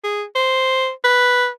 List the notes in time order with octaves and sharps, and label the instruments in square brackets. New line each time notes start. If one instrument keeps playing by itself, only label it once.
[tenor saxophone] G#4
C5
B4